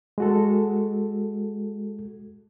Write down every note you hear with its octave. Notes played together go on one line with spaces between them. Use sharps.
G#3 F#4 A4